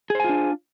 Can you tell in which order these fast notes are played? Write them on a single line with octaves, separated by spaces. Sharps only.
G#4 C5 G#5 F4 D4